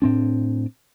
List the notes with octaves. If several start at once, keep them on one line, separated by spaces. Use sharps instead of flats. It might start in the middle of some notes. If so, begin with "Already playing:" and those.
A2 C4 D4